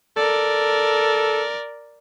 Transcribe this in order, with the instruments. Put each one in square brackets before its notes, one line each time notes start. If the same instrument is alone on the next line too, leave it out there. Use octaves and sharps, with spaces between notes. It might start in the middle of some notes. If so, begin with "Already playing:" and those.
[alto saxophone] A4 [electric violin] A#4 D5